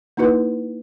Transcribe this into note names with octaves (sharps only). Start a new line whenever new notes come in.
A#3 D#4 E4 F#4 B4